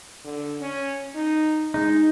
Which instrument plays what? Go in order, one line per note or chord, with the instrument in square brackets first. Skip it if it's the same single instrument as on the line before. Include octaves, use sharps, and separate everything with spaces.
[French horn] D3
C#4
D#4
[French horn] G#3 [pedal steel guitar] D#4